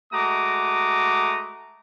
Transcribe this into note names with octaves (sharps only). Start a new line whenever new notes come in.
G#3 A3 F#4 A#5 D6 D#6